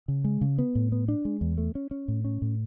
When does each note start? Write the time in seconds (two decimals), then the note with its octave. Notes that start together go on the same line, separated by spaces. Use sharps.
0.08 C#3
0.24 G#3
0.41 C#3
0.58 B3
0.75 A2
0.92 B3
1.08 D4
1.25 G#3
1.41 E2
1.58 A3
1.75 C#4
1.91 C#4
2.08 A2
2.25 C#4
2.42 A2